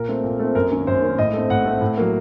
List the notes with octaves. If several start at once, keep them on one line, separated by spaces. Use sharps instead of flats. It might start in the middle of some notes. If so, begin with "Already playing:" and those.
Already playing: A#2 A#4
A3 C4
A#2
A3 C4
F#2 A#4
D#3 A#3 C#4
F#2 C5
D#3 A#3 C#4
A2 D#5
A3 C4
A2 F#5
A3 C4
A2
F#3 A#3